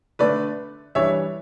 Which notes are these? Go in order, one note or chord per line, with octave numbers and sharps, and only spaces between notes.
D3 A3 D4 B4 D5
E3 G3 D4 C#5 E5